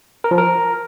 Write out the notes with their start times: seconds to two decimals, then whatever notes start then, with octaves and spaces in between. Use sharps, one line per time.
0.24 A#4
0.31 F3
0.38 A#4